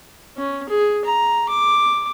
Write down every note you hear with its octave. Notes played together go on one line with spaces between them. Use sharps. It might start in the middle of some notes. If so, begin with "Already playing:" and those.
C#4
G#4
A#5
D6